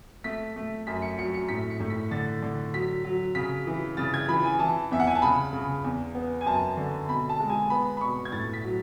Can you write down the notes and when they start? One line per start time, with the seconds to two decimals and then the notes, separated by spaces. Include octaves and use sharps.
0.24 A3 B6
0.56 A3
0.87 F#2 B6
1.02 C#7
1.19 F#3 C#7
1.34 C#7
1.49 A2 B6
1.70 C#7
1.80 A2
1.90 B6
2.11 D3 A6
2.42 D3
2.74 F#3 B6
3.04 F#3
3.35 C#3 B6
3.67 E3
3.97 C#3 A6
4.14 G#6
4.29 E3 B5
4.44 G#5
4.59 E3 A5
4.91 E2 E5
5.00 F#5
5.07 G#5
5.15 A5
5.22 C#3 B5
5.53 C#3
5.84 E2
6.15 B3
6.41 G#5
6.46 F#2 A5
6.77 D3
7.09 B2 B5
7.29 A5
7.40 G#3
7.50 G#5
7.70 B3 B5
7.97 B5
8.01 B2 C#6
8.25 G#6
8.32 A2 A6
8.53 B6
8.65 F#3